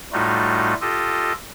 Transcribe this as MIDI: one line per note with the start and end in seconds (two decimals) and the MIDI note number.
0.13 0.74 45
0.13 0.74 55
0.13 0.74 57
0.13 0.74 63
0.13 0.74 65
0.13 0.74 66
0.81 1.33 65
0.81 1.33 67
0.81 1.33 69
0.81 1.33 75